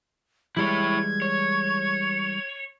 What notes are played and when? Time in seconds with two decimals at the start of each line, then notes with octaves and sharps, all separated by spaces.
0.57 E3 G3 G#3 E4 C#5 G#6
1.22 C#5